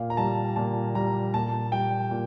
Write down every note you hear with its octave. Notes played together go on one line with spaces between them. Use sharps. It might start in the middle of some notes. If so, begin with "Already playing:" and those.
Already playing: A#2 F5
A#5
G3 A5
A#2 A5
G3 A#5
A#2 A5
G3 G5
A#2